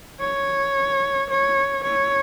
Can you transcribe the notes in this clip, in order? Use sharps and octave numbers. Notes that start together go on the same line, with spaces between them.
C#5
C#5
C#5